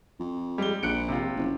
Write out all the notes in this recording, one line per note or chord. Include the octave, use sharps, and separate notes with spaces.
F2
G3 G#3 G7
A#1 F#6 C#7 D7
C3 F4
F#1